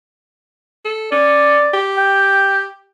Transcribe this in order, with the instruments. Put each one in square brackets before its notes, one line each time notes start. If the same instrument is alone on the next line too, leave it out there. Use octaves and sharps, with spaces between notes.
[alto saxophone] A4
[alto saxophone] C#4 [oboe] D5
[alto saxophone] G4
[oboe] G5